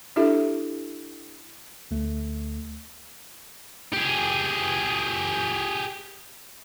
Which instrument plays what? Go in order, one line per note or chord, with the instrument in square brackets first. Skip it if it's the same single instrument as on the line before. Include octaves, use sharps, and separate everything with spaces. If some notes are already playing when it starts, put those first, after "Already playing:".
[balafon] D4 E4 G4 A4 E5
[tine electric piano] D2 A3
[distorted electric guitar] G4 G#4